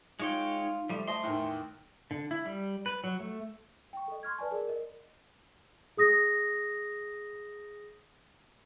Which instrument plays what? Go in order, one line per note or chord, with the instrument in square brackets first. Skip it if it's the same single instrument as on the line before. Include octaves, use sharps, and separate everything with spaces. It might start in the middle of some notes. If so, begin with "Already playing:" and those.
[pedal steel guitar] G#3 C#5 G5 [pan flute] D#4 [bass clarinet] F4
[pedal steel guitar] F3 G3 [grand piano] A3
[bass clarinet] A3 [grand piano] C5 D#5 A5 [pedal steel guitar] C6
[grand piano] E2 A2 D#3 [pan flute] G5
[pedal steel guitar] D3
E4
G3
B4
F#3
A3
[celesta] G5 C#6
A4 D#5
C6 C#6 F6 G#6
B4 D5 G#5 A5
G#4 A#4 D5
A#4 D#5
G#4 D#6 A#6